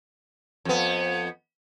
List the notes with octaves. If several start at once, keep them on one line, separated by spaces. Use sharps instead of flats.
F2 B3